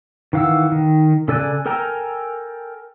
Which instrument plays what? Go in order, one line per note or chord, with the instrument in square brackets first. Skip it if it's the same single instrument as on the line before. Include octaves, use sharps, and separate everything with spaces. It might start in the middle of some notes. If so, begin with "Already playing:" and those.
[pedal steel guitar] D#3 E3 F5 F#5 E6
D#3
C#3 A4 D5 G#5 F#6
A4 A#4 G5 G#5 A#5